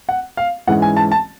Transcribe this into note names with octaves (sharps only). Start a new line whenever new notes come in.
F#5
F5
G#2 E3 G#3 C#4 F#5
G#5
A5
A5